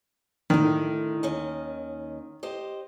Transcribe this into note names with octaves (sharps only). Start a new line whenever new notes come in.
A2 D3 D#3
D#2 C#4 D#5
G4 C5 D#5